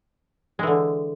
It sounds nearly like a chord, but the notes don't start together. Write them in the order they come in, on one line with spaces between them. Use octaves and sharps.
G#3 E3 D3